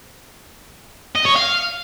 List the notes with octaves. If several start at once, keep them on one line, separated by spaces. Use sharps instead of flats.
D#5
C#5
F5